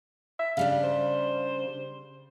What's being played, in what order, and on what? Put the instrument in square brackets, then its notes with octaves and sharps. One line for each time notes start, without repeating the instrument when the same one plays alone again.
[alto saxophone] E5
[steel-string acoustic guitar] C#3 G3 D4 [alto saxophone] F5
[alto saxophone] C5